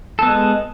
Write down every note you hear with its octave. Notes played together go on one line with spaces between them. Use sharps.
G#3 B3 A4